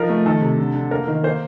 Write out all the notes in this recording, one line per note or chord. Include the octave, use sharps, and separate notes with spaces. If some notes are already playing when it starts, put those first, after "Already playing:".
Already playing: F3 D#4 A#4
A3
D#3 A4
C3
D3
D3
A#3 A#4
D#3
A#3 C5